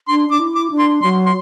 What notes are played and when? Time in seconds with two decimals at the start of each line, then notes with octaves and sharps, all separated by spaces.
0.08 D4 C6
0.29 D4 D6
0.39 E4
0.55 D6
0.71 D4
0.79 C6
1.02 F#3 C6
1.26 C6